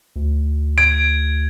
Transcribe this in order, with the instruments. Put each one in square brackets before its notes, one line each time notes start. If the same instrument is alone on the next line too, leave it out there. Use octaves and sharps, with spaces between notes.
[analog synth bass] D2
[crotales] G#6 [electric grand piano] D7